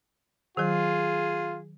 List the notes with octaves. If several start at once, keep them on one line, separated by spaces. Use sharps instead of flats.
D#3 F#3 F4 G#4